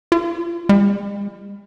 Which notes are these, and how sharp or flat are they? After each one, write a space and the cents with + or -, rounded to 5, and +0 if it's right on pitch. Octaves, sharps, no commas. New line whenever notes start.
F4 -30
G#3 -45